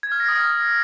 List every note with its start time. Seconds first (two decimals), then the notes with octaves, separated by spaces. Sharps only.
0.03 G#6
0.12 F6
0.20 A#6
0.28 D#6